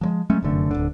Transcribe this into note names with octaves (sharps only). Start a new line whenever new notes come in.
F3 F#3 G#3
F#3 G#3 A3 C#4
F1 F#2 D3 A3
D1 B1 D3